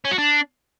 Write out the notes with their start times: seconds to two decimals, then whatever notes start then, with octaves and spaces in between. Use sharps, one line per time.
0.05 C#4
0.12 F#4
0.18 D4